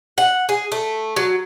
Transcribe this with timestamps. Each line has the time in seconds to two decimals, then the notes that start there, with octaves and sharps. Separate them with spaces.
0.18 F#5
0.49 G#4
0.72 A3
1.16 F#3